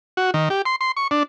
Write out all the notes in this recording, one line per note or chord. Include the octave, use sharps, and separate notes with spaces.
F#4
D#3
G4
C6
C6
C#6
D4